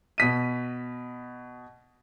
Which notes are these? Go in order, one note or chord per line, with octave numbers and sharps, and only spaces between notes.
B2 B6 D#7